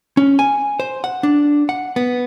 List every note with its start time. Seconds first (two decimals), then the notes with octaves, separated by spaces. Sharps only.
0.17 C#4
0.39 G#5
0.80 C5
1.04 F#5
1.23 D4
1.69 F#5
1.96 B3